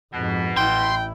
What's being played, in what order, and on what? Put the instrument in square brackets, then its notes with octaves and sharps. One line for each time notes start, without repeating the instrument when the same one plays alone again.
[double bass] F2 G#2 [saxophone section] B2
[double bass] A1 E4 [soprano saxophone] G5 [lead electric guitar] C6